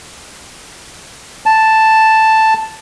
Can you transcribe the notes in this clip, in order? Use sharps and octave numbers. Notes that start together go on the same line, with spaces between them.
A5